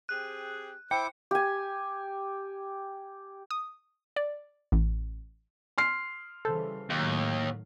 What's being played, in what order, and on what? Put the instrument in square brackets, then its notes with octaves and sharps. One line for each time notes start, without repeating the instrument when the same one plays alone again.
[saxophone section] C4 G4 G#4 [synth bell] F#6
[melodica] E4 D6 [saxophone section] C5 [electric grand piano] G5 [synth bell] C#7
[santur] G4 G#5
[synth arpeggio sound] D#6
D5
A1
[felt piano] C6 F6 C7
[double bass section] C#3 E3 G3 [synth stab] A4 C5
[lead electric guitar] D#2 [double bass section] A2 D#3 F#3